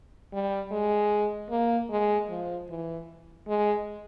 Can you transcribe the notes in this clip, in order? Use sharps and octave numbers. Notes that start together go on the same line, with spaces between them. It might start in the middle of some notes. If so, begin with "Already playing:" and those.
G3
G#3
A#3
G#3
F3
E3
G#3